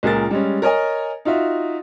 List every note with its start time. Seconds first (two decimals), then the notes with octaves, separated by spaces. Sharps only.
0.03 C#2 A#2 G#4 A#4 A6
0.31 G3 G#3 C#4
0.62 A#4 C#5 D#5 G#5
1.25 D#4 F4 F#4 E5